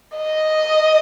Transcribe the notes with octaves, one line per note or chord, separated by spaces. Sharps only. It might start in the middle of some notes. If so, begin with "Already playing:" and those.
D#5